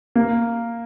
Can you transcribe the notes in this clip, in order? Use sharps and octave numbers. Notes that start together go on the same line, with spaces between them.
A#3